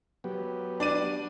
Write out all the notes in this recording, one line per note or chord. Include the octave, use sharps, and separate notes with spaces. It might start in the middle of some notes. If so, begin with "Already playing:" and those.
F#3 B3 G4
D4 D5 D#7